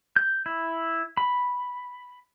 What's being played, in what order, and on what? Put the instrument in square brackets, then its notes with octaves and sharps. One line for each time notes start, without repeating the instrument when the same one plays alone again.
[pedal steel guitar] G6
E4
B5